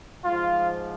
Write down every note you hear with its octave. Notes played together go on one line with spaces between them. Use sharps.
G#2 F3 F4